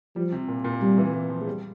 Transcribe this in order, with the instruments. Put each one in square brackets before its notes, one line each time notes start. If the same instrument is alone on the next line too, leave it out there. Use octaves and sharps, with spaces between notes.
[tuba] F3 [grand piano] G3
[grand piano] C3
A#2
A#2
[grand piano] C3 [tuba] G3
[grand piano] E3
E3
F3
G#3
G3